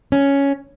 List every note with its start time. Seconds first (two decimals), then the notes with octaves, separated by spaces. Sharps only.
0.12 C#4